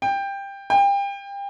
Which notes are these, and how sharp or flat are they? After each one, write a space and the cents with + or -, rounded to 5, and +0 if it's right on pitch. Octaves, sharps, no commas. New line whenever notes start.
G5 +15
G5 +30